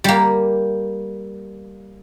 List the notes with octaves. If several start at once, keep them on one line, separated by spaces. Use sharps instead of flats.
G3 A#3